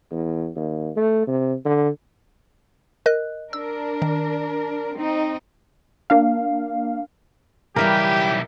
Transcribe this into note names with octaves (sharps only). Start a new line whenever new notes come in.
E2
D#2
A3
C3
D3
A#4 D#5 F#6
D4 A#4 E6
D#3
C4 D#4
A#3 D4 F5
B1 C#3 E3 G3 G4 A#4 E5 G5